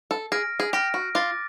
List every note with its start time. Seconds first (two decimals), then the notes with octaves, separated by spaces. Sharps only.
0.11 A4
0.32 G#4 F6 A#6 D7
0.60 G#4
0.73 G4 F6 A#6 D7
0.94 F#4
1.15 F4 D6 F#6 A6